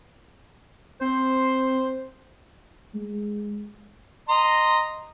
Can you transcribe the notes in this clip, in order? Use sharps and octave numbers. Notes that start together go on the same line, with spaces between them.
C4 C5
G#3
D#5 A#5 C6